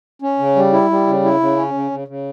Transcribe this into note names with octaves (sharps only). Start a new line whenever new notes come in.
C#4
C#3
G3
E4
G3
C#3
E4
C#3
C#4
C#3
C#3
C#3